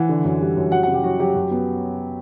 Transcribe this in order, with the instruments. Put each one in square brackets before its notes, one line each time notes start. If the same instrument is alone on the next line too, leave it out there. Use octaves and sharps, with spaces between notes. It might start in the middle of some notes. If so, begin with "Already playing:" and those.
Already playing: [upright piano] E3 F#5
D3
F#2
G3
F#2
F#3 F#5
C#3 F#5
G4
F#3 F#4
F#3 G4
F#2
B3